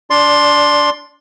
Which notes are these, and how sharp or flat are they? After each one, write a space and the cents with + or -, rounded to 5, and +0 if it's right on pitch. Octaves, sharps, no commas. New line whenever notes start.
D4 -20 D5 +0 C6 +10